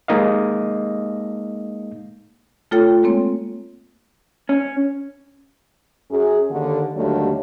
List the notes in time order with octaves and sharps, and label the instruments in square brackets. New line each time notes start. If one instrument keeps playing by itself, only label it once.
[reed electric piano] G#3 A#3 D#4 D#5 F5
[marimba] A3 F4 A4 C#5 G5
G#3 A#3 C4 C#5
[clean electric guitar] C#4
[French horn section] F#2 G#4
D#2 D3
D#2 D3 F#3 G3 A3